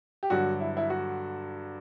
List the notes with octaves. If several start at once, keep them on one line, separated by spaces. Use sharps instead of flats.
G4
G2 D3 F#3 F#4
E4
E4
F#4